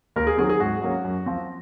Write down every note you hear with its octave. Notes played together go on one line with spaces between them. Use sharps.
D#2 A#4
G#4
D#3 F#3 C4 G#4
G#4
G#2 F#4
F#3 A#3 C#4
F#2
F3 C4